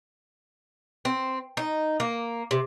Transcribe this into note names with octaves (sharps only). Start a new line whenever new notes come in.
C4
D#4
A#3
C3